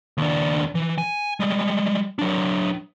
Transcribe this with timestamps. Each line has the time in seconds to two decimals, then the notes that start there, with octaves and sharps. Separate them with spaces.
0.18 D#2 D4
0.75 E3
0.98 G#5
1.40 G3 G#3
2.19 F#3 D4